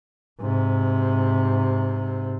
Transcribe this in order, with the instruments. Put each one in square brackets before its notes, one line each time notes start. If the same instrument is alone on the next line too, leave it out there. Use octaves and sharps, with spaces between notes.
[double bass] G#2 C3